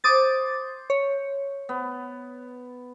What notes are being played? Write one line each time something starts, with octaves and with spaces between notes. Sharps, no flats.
C5 D6 D#6 A6
C#5
B3